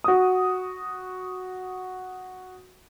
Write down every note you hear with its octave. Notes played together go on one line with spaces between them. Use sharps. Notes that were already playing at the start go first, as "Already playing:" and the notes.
F#4 D#6